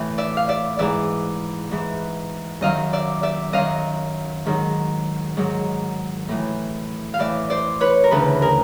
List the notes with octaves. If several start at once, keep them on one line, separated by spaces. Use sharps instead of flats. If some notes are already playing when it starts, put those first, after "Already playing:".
Already playing: A2 E3
D5 E5
F5
D5 E5
G#2 E3 D5 E5
G#2 E3
F#2 D#3 F#3 D#5 F5
D5 E5
D5 E5
F#2 D#3 F#3 D#5 F5
G#2 D#3 F#3
G#2 D#3 F#3
A2 E3
F5
A2 E3 D5 E5
C5 D5
B4 C#5
A#4
D2 C#3 E3 A4 B4
G#4 A#4